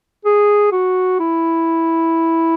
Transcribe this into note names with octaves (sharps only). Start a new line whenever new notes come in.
G#4
F#4
E4